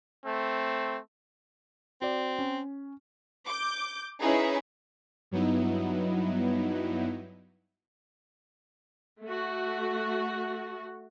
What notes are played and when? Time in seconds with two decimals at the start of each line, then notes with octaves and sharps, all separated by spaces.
0.25 A3 C4
2.02 C4 F#4 D5
2.39 C#4
3.47 D6 G6
4.20 C#4 D#4 E4 G#4 B4
5.31 G2 F#3 B3 D#4 E4
9.24 A3 F#4